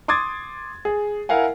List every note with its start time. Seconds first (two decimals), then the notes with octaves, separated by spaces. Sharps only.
0.08 C6 D6 D#6 G#6 A6
0.85 G#4
1.29 E4 A#4 F5 F#5 G#5